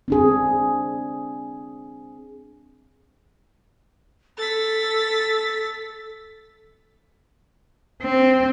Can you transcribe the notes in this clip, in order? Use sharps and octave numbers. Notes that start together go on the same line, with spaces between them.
C4 D4 G#4
A4 A6 B6
C4